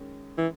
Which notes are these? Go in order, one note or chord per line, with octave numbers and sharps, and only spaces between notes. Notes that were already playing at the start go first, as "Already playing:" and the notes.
Already playing: F#2 D#3 G#3 C#4
E3